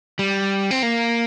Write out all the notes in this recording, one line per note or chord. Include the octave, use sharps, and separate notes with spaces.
G3
C4
A#3